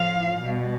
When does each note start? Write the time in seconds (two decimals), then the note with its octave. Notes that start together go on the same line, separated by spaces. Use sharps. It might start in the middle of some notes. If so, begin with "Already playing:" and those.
Already playing: A2 F3 F5
0.39 B2 G3